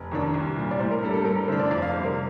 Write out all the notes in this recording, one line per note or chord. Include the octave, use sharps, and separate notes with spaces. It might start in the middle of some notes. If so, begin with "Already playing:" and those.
Already playing: F1
D#2 D#3 A#3 D4
C2
A#2 G3
D5
A2 C5
A#4
G3 A#3 D4 A4
A4
G2 A#4
A#4
D3 A3 D4 C5
D5
F2 D5
F5
C3 G3 C5
A#4